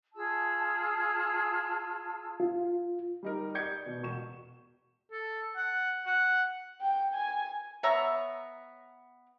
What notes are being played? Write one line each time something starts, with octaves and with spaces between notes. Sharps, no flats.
F4 G#4 A5 E6
F4
G3 D#4 A#4
D5 D#5 G6 G#6 C#7
B2
E1 C#6 E7
A4
F#5
F#5
G5
G#5
B3 C#5 E5 A#5